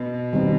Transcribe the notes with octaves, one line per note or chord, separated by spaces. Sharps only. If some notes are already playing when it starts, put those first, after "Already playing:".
Already playing: B2
D#3 G3 C4